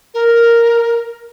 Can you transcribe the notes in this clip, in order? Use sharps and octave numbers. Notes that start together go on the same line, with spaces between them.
A#4